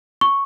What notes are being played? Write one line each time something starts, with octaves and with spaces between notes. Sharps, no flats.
C#6